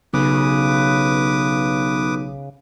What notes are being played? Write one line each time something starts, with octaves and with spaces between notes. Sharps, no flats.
B1 C#3 B4 D6 D#6